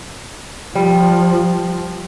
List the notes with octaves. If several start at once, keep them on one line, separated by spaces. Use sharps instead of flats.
F3 G3